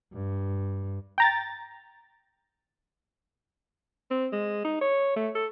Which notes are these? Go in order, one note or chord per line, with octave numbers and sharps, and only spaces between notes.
G2
G5 A#5 A6
C4
G#3
D#4
C#5
A3
A4